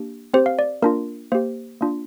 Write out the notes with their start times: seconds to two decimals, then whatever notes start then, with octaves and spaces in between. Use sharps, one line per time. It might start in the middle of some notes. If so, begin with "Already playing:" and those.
Already playing: A#3 D4 G4
0.34 C4 G4 C5
0.46 F5
0.59 D5
0.82 A#3 D4 F4 A#4
1.32 A#3 G4 C5
1.81 A#3 D4 F4